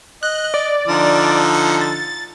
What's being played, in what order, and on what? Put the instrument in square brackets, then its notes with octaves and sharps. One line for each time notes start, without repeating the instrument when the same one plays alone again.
[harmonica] D#5 [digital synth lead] F#6
[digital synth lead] D5
[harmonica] D3 F3 D#4
[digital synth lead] C#7
A6